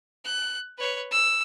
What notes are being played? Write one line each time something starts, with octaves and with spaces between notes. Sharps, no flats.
F#6
B4 C#5
E6